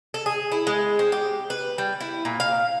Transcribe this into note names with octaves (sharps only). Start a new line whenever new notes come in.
A4
G#4
E4
G#3
C4
G4
B4
G3
E4
A#2
F5